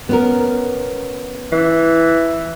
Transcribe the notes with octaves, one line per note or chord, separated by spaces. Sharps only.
B3 C#4 A#4
E3